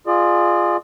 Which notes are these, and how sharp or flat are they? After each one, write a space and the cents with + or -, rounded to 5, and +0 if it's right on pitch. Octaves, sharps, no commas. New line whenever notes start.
F4 +0 G#4 +0 D5 +35